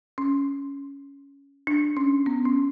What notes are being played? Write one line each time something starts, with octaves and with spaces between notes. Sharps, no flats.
C#4
D4
C#4
B3
C#4